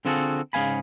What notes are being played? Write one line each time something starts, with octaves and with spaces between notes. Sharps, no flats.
D3 C4 F4 F#4 G#4 A4
G#2 C#3 B3 F5 G#5 B5